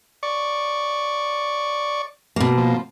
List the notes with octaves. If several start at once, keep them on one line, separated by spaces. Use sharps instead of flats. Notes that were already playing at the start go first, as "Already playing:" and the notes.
D5 C#6
B2 A#3
F3